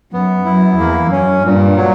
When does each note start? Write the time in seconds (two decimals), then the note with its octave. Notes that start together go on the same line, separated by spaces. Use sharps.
0.12 F#2 B3
0.45 F#2 E4
0.78 E2 A#3
1.11 F#2 C#4
1.44 G2 A#2
1.77 F#3